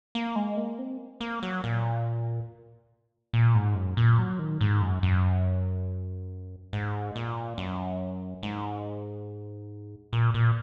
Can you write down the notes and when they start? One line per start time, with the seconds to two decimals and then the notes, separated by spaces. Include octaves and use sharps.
0.15 A#3
0.36 G#3
0.57 A#3
0.79 C4
1.21 A#3
1.43 F#3
1.64 A#2
3.33 A#2
3.55 G#2
3.75 F#2
3.97 A#2
4.19 F#3
4.39 D#3
4.61 G#2
4.82 F#2
5.03 F#2
6.73 G#2
7.16 A#2
7.58 F#2
8.43 G#2
10.13 A#2
10.34 A#2